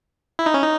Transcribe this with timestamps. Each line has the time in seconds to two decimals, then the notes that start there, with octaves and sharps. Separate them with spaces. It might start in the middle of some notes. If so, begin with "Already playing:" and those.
0.39 E4
0.46 D#4
0.54 C#4
0.63 D#4